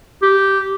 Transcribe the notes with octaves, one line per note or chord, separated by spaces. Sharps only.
G4